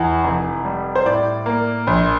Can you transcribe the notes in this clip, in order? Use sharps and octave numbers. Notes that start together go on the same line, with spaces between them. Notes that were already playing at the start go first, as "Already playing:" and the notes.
Already playing: E2 E3
F1
G3
C5
A2 D5
A#3
A#1